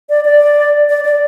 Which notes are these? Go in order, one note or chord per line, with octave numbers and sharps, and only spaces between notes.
D5
D5
D5
D5